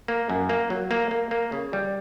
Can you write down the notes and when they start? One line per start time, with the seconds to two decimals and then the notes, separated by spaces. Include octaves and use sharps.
0.08 A#3
0.30 F#2
0.49 A#3
0.70 F#3
0.91 A#3
1.11 A#3
1.31 A#3
1.52 C#3
1.73 G3